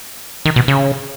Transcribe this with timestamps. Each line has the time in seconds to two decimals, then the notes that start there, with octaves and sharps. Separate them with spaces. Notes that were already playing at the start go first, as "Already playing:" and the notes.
0.45 D#3
0.56 B2
0.68 C#3